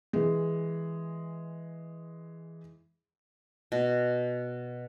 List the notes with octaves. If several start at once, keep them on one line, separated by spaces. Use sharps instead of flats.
E3 G#3
B2